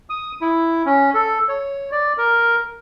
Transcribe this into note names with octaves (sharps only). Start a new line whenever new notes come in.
D#6
E4
C#4
A4
C#5
D5
A#4